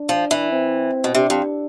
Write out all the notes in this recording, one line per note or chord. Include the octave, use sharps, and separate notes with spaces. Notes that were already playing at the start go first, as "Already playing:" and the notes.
Already playing: D4
F3
E3
C4
B2
C3 D4
F2